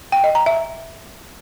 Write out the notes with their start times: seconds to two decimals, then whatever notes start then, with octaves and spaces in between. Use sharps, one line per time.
0.12 G5
0.24 D#5
0.35 A#5
0.46 E5